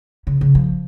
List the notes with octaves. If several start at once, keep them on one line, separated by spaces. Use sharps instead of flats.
C#3
C#3
F3